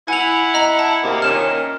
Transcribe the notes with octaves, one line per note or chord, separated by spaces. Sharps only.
E4 F#5 G#5 F7
D#5 A#5 F#7
A5
D2 C3 A#3
A#2 D#3 C#4 F6 E7